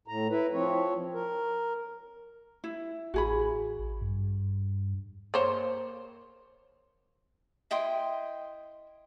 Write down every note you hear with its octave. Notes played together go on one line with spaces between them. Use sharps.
A2 A#5
E4 B4
F3 C4 C#5
A#4
E4
A1 F#4 G#4 B5
G2
A#3 C5 C#5
E4 D#5 G5 C6